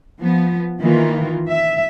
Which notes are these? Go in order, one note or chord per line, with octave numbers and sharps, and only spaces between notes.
F3 B3
D#3 E3 A#3 F4
E5